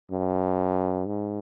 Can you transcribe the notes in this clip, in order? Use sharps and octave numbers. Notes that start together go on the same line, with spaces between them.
F#2
G#2